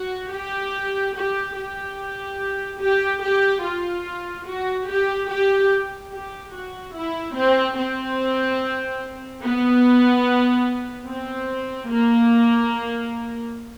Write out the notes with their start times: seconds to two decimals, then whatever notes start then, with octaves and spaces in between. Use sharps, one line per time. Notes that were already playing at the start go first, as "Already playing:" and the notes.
Already playing: F#4
0.34 G4
1.17 G4
1.58 G4
2.82 G4
3.23 G4
3.64 F4
4.47 F#4
4.89 G4
5.30 G4
6.12 G4
6.54 F#4
6.96 E4
7.37 C4
7.78 C4
9.43 B3
11.08 C4
11.91 A#3